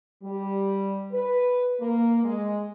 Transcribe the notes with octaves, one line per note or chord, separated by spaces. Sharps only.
G3
B4
A#3
G#3